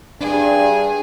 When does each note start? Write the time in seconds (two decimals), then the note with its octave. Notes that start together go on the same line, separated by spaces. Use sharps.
0.21 G2 D4 G#4